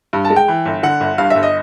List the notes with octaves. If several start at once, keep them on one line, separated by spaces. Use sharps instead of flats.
G2
A5
G#3
G5
E3
G1
D3 F#5
G1
G2 F5
E5
G1
D#5